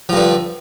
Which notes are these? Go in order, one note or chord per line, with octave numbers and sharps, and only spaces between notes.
G2 D3 F3